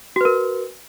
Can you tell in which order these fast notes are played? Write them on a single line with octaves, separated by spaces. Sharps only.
F#4 B4 A#4